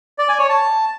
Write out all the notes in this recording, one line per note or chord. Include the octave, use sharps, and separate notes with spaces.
D5
G#5
C#5
A5